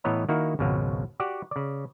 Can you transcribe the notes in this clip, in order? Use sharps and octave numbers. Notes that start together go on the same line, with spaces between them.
A2 E3 B3 C#5 D#5 A#5
D#3 A#3 D#4 E4 F#4
G#1 C#2 B2 F#3 F5
F#4 G4 D5 F#5
C#3 D5